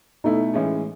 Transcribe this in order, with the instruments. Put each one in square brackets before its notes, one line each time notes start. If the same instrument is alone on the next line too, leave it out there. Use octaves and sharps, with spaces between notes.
[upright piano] B2 A3 E4 [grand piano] D#4
[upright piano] A2 E3 G#3 C#4